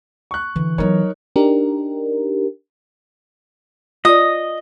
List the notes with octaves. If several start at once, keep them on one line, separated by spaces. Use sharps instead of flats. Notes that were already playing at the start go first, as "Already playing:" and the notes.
C#6 F#6
D3 E3
F#3 B3 D#4 A#4 C#5
D4 D#4 G4 A#4
F4 D5 D#5 D#6